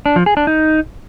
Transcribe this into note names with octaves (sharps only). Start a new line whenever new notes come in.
D4
F3
G#4
D4
D#4